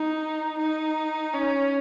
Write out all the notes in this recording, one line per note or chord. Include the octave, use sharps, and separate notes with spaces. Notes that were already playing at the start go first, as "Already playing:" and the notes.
Already playing: D#4
D#4
C#4